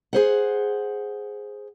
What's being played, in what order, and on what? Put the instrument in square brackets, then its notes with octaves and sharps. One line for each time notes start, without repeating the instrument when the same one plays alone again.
[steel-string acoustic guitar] G#4 C5 F#5